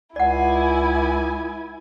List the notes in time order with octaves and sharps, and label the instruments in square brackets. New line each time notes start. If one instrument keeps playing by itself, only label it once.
[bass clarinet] C#2 [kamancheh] E4 G#5 [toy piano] D5 F#5